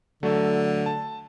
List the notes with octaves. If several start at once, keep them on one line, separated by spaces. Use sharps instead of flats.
D3 F#3 A3
A5